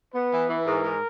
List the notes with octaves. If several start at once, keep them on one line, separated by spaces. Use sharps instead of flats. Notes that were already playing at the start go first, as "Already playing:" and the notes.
B3 B4
E3
E3
G#2 A#4
G#2